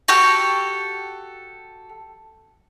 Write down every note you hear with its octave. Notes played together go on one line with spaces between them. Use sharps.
F#4 G4 A4